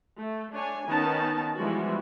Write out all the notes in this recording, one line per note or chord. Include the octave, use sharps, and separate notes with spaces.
A3
A3 D4 C#5 G#5
D#3 B3 C#4 D#4 A5
E3 F3 G3 G#3 B3 F#4